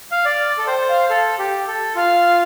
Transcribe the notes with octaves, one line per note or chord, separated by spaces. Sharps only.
F5
D5 A6
A6
A4
C5 G5
F5
A4
G4
A4
F4 F5